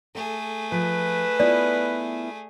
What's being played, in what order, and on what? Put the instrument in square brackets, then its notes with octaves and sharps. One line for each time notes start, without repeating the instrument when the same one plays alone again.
[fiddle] A3 G#4 [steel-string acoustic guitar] A4
[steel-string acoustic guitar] F3 [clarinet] B4
[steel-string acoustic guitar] B3 E4 F4 [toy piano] D5